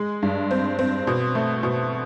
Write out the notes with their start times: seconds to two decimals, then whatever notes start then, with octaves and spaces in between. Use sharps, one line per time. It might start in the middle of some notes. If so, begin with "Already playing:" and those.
Already playing: G#3
0.23 G2
0.51 C4
0.79 C4
1.07 B2
1.35 A3
1.63 B2